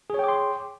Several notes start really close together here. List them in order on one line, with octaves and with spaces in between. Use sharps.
G#4 C#5 G5 D6 C6